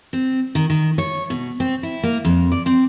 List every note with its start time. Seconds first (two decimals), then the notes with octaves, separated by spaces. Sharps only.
0.13 C4
0.55 D#3
0.70 D#3
0.98 C#5
1.30 B2
1.60 C4
1.83 E4
2.03 A#3
2.25 F2
2.52 D5
2.66 C4